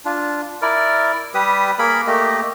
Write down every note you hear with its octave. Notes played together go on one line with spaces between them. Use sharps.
D4 F4
E4 A#4 D5
G3 G4 B4 D#6
A#3 G#4 A#4 B5
A3 A#3 G4 D#5